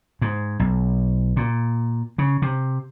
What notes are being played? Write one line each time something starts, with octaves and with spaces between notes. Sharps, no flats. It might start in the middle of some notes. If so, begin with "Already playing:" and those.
G#2
B1
A#2
C#3
C3